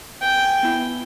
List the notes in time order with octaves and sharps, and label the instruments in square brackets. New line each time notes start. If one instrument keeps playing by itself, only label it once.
[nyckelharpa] G5 G#5
[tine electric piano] B3 E4